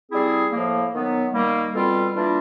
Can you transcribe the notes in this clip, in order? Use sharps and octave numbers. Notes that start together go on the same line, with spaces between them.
G3 C4 E4 G#4
A2 F3 A#3
D#3 F#3 B3
D#3 G3 A#3
B2 G3 C4 F4 A4
E3 G3 A#3 D4 F4